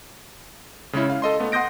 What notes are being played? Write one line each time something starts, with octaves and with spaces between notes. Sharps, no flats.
C#3 G#3 C#4 E4
F5
A4 D#5 C6
A3 B3
F#5 C6 D#6 G6 A#6 D7